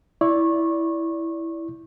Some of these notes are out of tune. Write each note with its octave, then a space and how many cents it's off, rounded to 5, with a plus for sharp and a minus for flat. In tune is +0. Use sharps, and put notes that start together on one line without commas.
E4 +0 D5 -20 C#6 -25